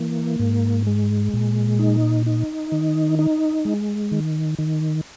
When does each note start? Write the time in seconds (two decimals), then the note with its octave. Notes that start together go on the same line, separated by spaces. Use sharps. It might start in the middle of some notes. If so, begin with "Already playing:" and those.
Already playing: E3 A#3
0.40 G#2
0.87 G#3
1.34 A#2
1.79 D#4
2.26 D#4
2.72 D#3
3.19 D#4
3.65 G#3
4.11 D#3
4.59 D#3